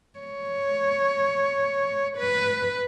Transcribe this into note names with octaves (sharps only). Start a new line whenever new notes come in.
C#5
B4